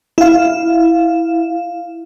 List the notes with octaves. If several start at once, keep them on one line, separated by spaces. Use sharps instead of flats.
E4 F5